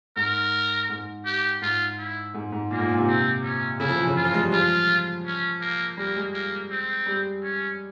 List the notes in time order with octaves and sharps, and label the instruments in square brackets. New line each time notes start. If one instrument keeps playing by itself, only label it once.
[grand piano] G#2 [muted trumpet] A#4
[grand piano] G#2
[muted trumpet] G4
[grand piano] G#2 [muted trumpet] F4
[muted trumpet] E4
[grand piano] G#2
G#2
[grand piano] A#2 [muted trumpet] A#3
[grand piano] G#2
A#2
C3
[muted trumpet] C4
C#4
[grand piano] C#3 [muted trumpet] E4
[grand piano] F3
E3
C#3
[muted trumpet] F4
[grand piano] F3
G#3
G3
[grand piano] F3 [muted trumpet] F4
[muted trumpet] C#4
A#3
[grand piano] G3 [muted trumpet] A#3
[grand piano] G#3
[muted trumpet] A#3
C4
[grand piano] G3
[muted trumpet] C#4